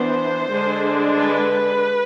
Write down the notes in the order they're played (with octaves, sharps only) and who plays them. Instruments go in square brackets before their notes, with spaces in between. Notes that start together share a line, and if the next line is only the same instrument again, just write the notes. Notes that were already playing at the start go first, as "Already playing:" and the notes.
Already playing: [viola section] E3 B3 D4 C5
D3 G#3 D4
B4